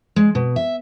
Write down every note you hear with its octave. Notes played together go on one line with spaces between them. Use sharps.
G#3
B2
E5